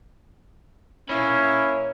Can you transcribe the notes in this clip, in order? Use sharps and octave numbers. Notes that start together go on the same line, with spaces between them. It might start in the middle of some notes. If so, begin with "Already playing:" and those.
A#3 C#4 E4 C#5 E5 B5